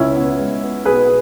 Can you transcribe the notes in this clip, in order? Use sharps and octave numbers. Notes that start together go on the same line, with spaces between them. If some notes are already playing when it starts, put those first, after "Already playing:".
Already playing: C#2 C#4 E4
B3
G#3
B3
B1 G#4 B4